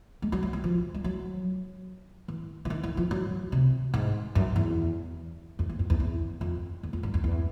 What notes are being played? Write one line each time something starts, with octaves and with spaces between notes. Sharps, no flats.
G#3
F#3
F#3
G3
F3
G3
F#3
E3
E3
D#3
E3
F3
F#3
C3
G#2
F#2
E2
F2
E2
F2
E2
E2
F2
E2
F2
G2
F2
E2